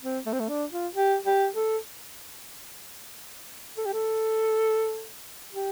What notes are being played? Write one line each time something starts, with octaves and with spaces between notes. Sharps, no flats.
C4
A3
C4
A3
D4
F4
G4
G4
A4
A4
G4
A4
G4